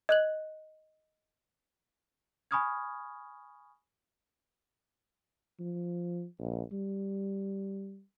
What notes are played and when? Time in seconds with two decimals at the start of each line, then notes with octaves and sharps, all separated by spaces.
0.09 D#5 F#6 F#7
2.51 G#5 B5 C#6 D#6 F6 G#6
5.60 F3
6.39 A#1
6.72 G3